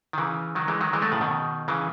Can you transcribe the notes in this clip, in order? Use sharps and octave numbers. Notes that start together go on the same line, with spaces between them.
D#3
C#3 E3
D#3 F#3
E3 G#3
D#3 F#3
E3 G#3
F#3 A3
A2 C#3
B2 D#3
C#3 E3